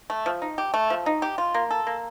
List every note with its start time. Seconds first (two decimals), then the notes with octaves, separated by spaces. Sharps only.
0.10 A3
0.26 F3
0.42 D#4
0.58 G4
0.74 A3
0.90 F3
1.06 D#4
1.22 G4
1.38 F4
1.54 A#3
1.71 A4
1.87 A#3